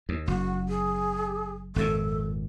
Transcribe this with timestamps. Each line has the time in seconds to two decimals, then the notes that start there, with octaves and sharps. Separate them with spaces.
0.09 D#2
0.28 F#1 F#4
0.69 G#4
1.76 G#1 F2 A#2 A4